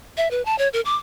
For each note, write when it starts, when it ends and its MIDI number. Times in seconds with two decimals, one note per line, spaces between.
0.17 0.30 76
0.31 0.44 71
0.45 0.58 81
0.58 0.68 73
0.73 0.81 70
0.85 0.95 86